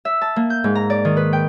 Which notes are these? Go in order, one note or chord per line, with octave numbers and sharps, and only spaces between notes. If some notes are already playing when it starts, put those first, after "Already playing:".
E5
A5
A#3
G6
G#2
A#5
D5
D#3
B4
G5